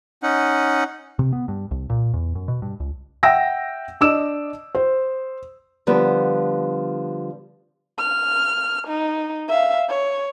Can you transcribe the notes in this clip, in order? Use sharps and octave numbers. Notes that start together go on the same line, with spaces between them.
C#4 D#4 F#5
C3
B3
G2
C2
A#2
E2
F#2
B2
G2
C#2
E5 F#5 G5 E6 A#6
D4 D#5 D6 E6 E7
C5
D3 F3 G3 B3
F6
D#4
E5 F5
C#5